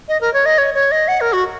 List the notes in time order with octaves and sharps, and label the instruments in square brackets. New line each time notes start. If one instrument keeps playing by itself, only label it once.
[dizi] D#5
A#4
C#5
D#5
C#5
C#5
D#5
F#5
A#4
F#4